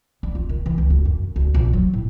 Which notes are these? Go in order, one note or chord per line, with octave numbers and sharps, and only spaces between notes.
G3
F4
D#3
E3
C#2
D2
F#2
F#2
D2
A#1
F#3
A2